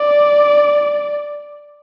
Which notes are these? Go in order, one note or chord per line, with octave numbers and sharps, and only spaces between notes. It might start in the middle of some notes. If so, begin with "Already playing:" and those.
Already playing: D5